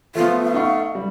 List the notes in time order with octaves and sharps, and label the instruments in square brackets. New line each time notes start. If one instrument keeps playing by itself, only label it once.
[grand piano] F3 B3 [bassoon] A3 [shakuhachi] F4
[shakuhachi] F5
[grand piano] D#4 F#5 C#6
G3